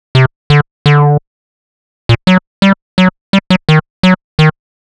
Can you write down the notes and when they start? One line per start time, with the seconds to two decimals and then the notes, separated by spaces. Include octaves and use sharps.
0.15 C3
0.50 D3
0.86 D3
2.09 A#2
2.27 F#3
2.62 G3
2.98 F#3
3.33 G3
3.50 F#3
3.69 D#3
4.03 F#3
4.39 D#3